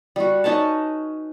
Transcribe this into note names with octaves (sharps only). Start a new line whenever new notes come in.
G3 F#4
C#4 D#4 B4 A5